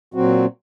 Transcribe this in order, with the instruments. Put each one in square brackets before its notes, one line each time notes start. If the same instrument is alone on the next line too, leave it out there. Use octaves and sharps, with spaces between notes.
[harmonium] A#2 F#3 C4 F#4